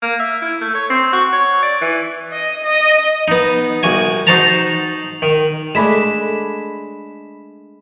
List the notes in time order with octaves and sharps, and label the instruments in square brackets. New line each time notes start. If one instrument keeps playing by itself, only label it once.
[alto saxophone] A#3
E5
E4
A3
C#5
C4
F#4
C#5
D5
E3
[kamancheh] D#5
D#5
[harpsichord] B3 D#4
C2 F#4 G#5
D#4 F#4 C5 F#5 A5 A#5
D#3
[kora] G#3 A3 D4 [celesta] B5 B6 E7